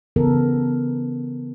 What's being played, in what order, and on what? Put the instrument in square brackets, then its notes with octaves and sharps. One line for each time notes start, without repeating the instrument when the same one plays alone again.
[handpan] C#3 E3 B3 A4 A#4